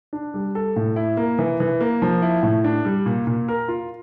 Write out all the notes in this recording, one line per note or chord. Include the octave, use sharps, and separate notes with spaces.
D4
G3
A4
A2
E4
A#3
E3
E3
A#3
F3
E4
A2
D4
G3
A#2
A#2
A#4
F4